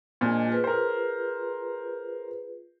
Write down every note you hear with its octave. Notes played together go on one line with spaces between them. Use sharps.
A#2 F3 G#3 D4 D#5
F4 G#4 B4
A#4 C5